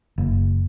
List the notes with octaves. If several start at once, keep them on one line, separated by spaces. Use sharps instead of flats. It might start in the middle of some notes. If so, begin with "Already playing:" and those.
F#1